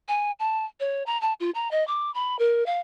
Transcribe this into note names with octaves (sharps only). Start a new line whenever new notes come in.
G#5
A5
C#5
A#5
A5
F4
A#5
D#5
D6
B5
A#4
F5